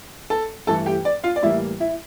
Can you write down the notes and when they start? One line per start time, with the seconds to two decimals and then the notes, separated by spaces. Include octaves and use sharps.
0.30 A4 A5
0.67 G2 E3 A3 A4 A5
0.86 G4 G5
1.05 D5
1.24 F4 F5
1.36 D5
1.43 A2 E3 G3 A#3 E4 E5
1.80 E4 E5